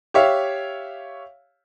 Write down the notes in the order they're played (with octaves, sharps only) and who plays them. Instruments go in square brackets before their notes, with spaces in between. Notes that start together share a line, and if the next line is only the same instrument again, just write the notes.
[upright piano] G4 C#5 E5 F5